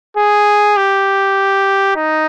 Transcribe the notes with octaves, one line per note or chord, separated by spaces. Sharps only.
G#4
G4
D#4